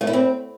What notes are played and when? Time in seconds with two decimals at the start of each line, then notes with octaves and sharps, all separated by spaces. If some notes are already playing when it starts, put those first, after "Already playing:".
0.01 A3
0.07 E4
0.13 C4